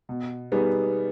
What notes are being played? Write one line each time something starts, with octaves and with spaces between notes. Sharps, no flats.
B2
G3 B3 D#4 G#4